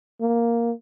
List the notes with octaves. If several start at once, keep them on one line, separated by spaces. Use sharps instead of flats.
A#3